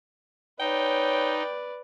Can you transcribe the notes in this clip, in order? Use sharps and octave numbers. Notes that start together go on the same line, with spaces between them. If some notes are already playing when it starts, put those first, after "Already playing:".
D#4 B4 C#5 D5 G5